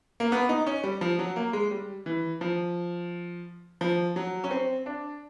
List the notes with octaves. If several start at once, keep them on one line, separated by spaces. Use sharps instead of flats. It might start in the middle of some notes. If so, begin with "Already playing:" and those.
A#3
B3
D#4
C#4
G3
F3
F#3
A#3
G#3
G3
E3
F3
F3
F#3
C#4
C4
D4